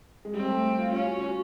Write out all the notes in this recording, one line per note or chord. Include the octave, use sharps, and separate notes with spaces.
G#3
G3 C4
A3
F4
C#4 F4
F#4
F#4